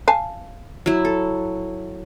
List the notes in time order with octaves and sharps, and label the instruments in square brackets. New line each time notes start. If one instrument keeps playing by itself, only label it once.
[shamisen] F5 G#5 A5
[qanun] F#3 E4
A4